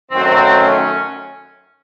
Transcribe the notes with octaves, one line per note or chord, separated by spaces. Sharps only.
F#2 D#3 F#3 A3 C4
C#4